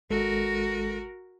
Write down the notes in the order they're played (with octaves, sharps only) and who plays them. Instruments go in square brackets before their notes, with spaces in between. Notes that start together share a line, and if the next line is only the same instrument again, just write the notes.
[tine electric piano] G#1 G#3 A4 [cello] F#4 A#4